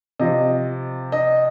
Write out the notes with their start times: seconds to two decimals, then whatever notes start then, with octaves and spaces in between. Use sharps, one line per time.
0.19 C3 F3 D#5
1.12 D#5